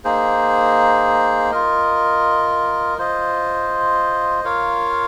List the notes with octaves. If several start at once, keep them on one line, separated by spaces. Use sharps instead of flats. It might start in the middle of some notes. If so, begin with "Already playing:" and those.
A#3 D#4 G#4 C5
F4 A#4 D#5
F4 C5 D#5
F4 A#4 C#5 F5